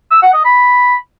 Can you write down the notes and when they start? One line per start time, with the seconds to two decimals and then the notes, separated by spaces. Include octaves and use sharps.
0.11 E6
0.22 F#5
0.33 D#5
0.45 B5